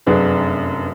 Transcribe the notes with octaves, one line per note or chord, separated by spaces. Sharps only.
F1 F#2 B3 D4 G#4